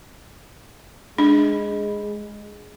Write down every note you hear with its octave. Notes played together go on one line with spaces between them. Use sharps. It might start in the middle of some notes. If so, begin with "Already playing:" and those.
G#3 D4